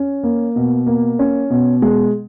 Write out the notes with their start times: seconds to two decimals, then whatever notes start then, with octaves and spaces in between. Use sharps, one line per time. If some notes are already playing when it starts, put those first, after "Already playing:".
Already playing: C#4
0.24 A#3
0.56 B2
0.86 A#3
1.19 C#4
1.50 B2
1.82 G#3